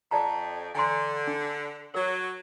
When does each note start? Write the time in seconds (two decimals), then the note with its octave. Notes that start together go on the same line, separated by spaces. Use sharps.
0.11 F2 D5 A5 A#5
0.75 D3 G#5 A#5 C6
1.27 D4
1.95 F#3 A#4